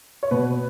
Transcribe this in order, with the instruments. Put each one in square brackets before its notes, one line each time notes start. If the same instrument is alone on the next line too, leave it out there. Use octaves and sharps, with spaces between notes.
[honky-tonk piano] C#5
[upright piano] B2 [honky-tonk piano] B4